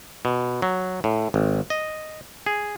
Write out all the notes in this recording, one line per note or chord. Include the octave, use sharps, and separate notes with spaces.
B2
F#3
A2
G#1
D#5
G#4